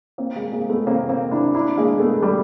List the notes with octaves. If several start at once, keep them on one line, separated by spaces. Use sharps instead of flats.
A#3 C4
G#3 A#3
G#3 A#3
A3 B3
A#3 C4
A#3 C4
D4 E4
D4 E4
G#3 A#3
A3 B3
G3 A3